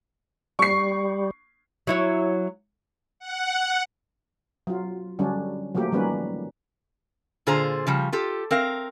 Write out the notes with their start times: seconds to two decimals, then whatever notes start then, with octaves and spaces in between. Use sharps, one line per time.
0.59 G3 C#6 C7
1.87 F#3 E4 C#5
3.19 F#5
4.67 F#3 F4
5.19 D3 F#3 G3 C#4 D4
5.75 F3 F#3 A3 A#3 G4
5.92 D#3 F#3 G3 A#3 C#4 B4
7.47 A#2 D3 F4 G#4 C5 A#5
7.87 C#3 F3 G3
8.12 F4 G4 A4
8.51 C4 A#4 F5